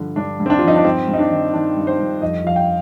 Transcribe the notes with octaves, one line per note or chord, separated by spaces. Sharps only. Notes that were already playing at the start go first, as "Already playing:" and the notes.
Already playing: G2 D3 F3
G2 D4
G2
C4
D4
F3 F4
D#4
D4
G2 C4
G2
D#4
D4
D#3
D#3 D4
G2
C5
G2
F2 D#5
F3 F5
G5